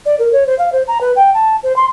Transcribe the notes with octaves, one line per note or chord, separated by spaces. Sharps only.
D5
A#4
C#5
C5
F5
C5
A#5
B4
G5
A5
C5
C6